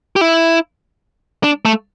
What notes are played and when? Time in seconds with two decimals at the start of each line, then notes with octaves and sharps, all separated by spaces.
0.16 G4
0.21 E4
1.44 D4
1.65 A3